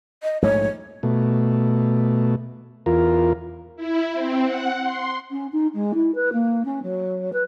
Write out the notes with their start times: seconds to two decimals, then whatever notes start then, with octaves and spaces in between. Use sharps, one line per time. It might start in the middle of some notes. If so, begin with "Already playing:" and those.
0.23 D#5
0.42 A#1 G#2 A3 C#5
1.03 B2 A3
2.86 E2 F4 A#4
3.76 E4
4.14 C4
4.44 F#5
4.81 C6
5.31 C#4
5.52 D#4
5.74 G#3
5.94 E4
6.15 B4
6.32 A#3
6.65 C#4
6.82 F#3
7.33 B4